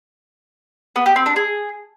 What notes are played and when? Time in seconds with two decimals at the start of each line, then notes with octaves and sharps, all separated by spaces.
0.96 B3
1.06 G4
1.16 C4
1.26 D4
1.36 G#4